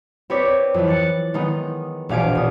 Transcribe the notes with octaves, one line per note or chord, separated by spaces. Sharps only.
C4 G4 B4 C#5 D5
F2 E3
F#6 A6 C#7
D#3 G#3 B3 D#4
E1 A#1 F5 G#5 D7
A#1 D#6